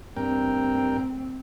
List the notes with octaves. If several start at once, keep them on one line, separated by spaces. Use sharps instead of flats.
G2 C4 A#4 G5